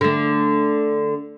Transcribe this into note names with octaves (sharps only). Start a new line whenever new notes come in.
D3 A3